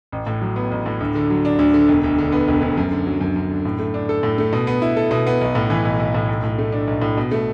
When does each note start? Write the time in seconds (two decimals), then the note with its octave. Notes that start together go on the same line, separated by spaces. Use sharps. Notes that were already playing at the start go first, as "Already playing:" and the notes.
0.12 A1
0.27 A2
0.41 F#3
0.56 B3
0.71 A1
0.86 A2
1.01 D2
1.15 D3
1.30 F#3
1.45 D4
1.59 D2
1.74 D3
1.89 E1
2.04 D2
2.18 D3
2.32 B3
2.48 E1
2.61 D2
2.77 F#2
2.91 D3
3.06 F#3
3.21 F#2
3.36 F#2
3.50 D3
3.65 A2
3.79 A3
3.94 D4
4.09 A4
4.23 A2
4.38 A3
4.53 B2
4.67 B3
4.82 E4
4.97 A4
5.11 B2
5.27 B3
5.41 B1
5.55 A2
5.70 E3
5.85 B1
6.00 B1
6.14 A2
6.29 B1
6.43 A2
6.58 A3
6.72 D4
6.87 B1
7.02 A2
7.17 B2
7.31 A3